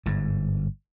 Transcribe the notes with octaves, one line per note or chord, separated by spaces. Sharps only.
G1 G#2